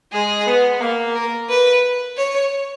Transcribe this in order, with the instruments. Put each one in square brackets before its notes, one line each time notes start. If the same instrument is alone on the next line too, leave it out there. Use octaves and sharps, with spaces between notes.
[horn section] G#3 [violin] G#4
[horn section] B3
A#3
[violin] A#4
B4
C#5